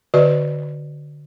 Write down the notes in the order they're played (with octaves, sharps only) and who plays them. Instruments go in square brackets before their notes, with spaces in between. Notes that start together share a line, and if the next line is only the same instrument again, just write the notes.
[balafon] D3 F#4 B4 D5 D#5